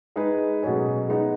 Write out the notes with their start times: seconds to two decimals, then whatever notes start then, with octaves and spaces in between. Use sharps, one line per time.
0.16 G#3 D#4 G#4 B4
0.62 B2 F#3 A3 C#4 G#4
1.09 G#3 B3 D#4